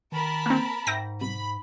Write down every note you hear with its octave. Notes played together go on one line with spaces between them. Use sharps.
D#3 A#4 A5 B5
A#3 C4
G#2 E5 G5 A#6
C2 B5